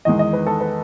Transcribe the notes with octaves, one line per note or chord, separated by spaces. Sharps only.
E2 D#3 G#3 D#5
D#5
B4
A4
B4